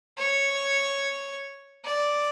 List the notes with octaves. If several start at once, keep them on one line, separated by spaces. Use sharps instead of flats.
C#5
D5